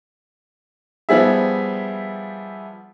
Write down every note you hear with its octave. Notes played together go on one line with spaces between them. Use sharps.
F3 G3 B3 G#4 E5